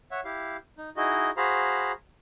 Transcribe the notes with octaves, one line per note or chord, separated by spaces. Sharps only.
C#5 E5 F#5
E4 G4 F5
D#4
D#4 E4 F#4 G#4 D#5
F#4 G#4 C5 F5 A#5 B5